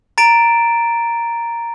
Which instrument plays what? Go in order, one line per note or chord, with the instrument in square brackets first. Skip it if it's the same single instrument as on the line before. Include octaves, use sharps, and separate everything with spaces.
[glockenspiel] A#5 A6 D7 E7